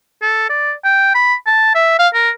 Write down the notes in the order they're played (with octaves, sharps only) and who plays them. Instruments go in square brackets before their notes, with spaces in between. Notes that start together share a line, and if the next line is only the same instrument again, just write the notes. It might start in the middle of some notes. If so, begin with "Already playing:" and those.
[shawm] A4
D5
G5
B5
A5
E5
F5
A#4